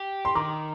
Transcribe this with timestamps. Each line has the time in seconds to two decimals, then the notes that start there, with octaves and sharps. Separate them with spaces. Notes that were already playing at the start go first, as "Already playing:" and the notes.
Already playing: G4
0.25 C6
0.35 D#3 A#5 D6